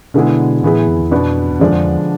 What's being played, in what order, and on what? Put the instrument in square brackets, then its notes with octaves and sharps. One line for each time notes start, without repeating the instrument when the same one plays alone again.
[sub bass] B2 [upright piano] D3 G#3 B3 E4 G#4
[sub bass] A2 [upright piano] E3 B3 E4 G#4
[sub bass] F2
E2
[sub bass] F2 [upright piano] B2 B3 D4
[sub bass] E2
[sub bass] F2 [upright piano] D3 F3 G#3 D4 G#4
[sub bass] F2
E2